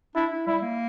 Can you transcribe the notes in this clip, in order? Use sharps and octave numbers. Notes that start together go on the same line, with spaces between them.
D4 E4
E4
G3 E4
A#3